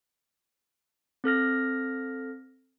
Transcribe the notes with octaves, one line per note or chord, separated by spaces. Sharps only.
C4 A4 F6 A#6